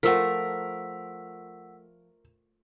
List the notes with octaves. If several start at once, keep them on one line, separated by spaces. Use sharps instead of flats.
F3 A3 A#4 F#5 E6 B6